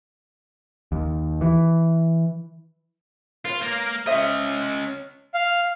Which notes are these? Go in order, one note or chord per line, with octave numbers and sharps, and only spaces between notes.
D#2
E3
F4 B4 C#5
A#3 A#4
C#4 C5 C#5 D#5 E5
F5